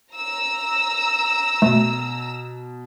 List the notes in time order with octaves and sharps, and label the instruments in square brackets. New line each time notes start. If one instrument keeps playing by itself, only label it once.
[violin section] A#5 E6
[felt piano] B2 [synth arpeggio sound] A3